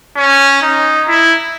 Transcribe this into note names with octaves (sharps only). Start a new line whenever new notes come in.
C#4
D#4
E4